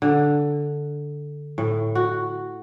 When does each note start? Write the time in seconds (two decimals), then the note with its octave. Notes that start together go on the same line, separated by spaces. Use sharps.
0.02 D3
1.58 A2
1.95 F#4